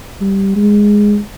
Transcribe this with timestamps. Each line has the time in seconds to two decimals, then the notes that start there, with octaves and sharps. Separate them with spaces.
0.21 G3
0.56 G#3